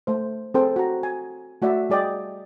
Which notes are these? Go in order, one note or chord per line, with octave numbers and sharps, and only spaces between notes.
A3 C5
C4 G#4 A4 C5 G5
F#4 A#5
G#5
A3 F#4 D5 E5
G3 G#4 D5 D#5 G5